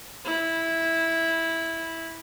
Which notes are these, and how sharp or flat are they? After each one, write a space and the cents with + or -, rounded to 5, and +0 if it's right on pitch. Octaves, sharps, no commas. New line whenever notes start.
E4 -10